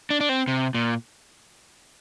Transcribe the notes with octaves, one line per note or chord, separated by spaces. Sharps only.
D4
D4
C4
C3
A#2